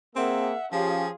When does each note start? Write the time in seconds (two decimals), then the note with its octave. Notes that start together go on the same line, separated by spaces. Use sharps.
0.16 A#3 C4 G#4 A#4 E5 F#5
0.72 F3 C#4 F4 G4 G#4